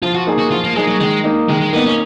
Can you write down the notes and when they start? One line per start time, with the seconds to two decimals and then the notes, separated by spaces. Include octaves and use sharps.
0.02 F3 F4
0.15 F#4
0.27 A#3 D#4 G#4
0.38 F#4
0.51 F3 F4
0.64 A#3
0.75 G#3 A#3 D#4 G#4
0.87 F#3
1.00 D#3 G#3
1.24 A#3 D#4
1.49 D#3 G#3
1.61 G#3
1.73 A#3 B3 D#4
1.86 C#4